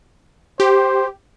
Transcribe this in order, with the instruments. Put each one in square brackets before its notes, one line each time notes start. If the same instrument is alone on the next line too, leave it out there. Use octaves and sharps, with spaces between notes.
[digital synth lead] G4 [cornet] C5